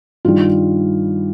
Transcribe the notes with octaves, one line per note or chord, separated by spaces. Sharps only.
G2 D#3 G3 F4